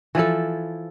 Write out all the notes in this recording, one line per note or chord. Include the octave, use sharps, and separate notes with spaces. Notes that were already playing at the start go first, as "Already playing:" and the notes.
E3 F3 E4 A4